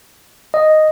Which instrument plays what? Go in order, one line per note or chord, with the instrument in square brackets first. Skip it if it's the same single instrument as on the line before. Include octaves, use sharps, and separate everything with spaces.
[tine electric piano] D#5